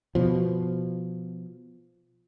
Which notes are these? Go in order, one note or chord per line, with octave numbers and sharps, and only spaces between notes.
B2 F3